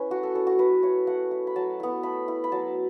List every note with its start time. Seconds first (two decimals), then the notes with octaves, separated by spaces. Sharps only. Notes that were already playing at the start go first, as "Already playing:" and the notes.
Already playing: C#4 E4 B4
0.10 A3 F#4
0.23 A4
0.35 C#4 E4 A4
0.47 F#4
0.59 A3 B4
0.83 E4 C#5
1.07 A3 F#5
1.31 E4
1.47 B5
1.56 F#3 A5
1.80 B3 E4
2.03 A3 B5
2.28 E4
2.44 B5
2.52 F#3 A5